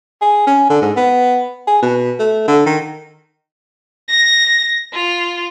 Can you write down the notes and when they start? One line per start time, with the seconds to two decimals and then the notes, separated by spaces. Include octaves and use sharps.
0.21 G#4
0.47 C#4
0.70 D3
0.82 G#2
0.97 B3
1.67 G#4
1.82 B2
2.19 A3
2.48 D3
2.66 D#3
4.08 A#6
4.93 F4